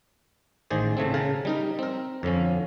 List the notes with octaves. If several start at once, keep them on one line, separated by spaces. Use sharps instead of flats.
A1 D#3 G#4 C5 D5
A2 C#3 A3 C4
C#3 A#4 A5
G3 D#4 A#4
C4 A#4
F2 D3 F3 C#4